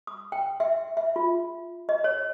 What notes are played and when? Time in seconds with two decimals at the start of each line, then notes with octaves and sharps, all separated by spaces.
0.07 D#6
0.32 G5
0.60 E5
0.97 E5
1.16 F4
1.89 D#5
2.04 C#5